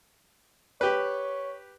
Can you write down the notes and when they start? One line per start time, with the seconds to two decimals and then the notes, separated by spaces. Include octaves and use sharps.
0.81 G4 B4 C#5